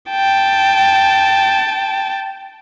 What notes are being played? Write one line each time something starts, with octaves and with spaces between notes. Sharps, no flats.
G5 A5